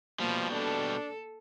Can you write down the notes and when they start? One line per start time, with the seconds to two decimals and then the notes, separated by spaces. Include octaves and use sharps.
0.20 B2 F3 G3 A#3
0.52 D4 A4